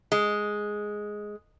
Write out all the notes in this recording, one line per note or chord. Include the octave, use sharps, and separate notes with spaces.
G#3